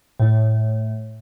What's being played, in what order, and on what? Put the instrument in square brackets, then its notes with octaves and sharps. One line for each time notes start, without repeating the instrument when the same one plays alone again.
[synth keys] A2